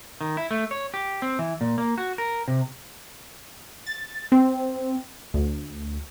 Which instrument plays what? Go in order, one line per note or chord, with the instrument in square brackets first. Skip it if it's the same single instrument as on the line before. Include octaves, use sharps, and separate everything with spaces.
[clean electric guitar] D#3
E4
A3
C#5
G4
C4
E3
A#2
A#3
F#4
A#4
C3
[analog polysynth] A6
C4
D2